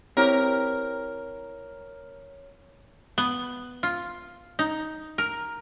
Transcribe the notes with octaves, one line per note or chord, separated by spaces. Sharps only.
C4 E4 G4 A#4 C#5
B3
F4
D#4
A#4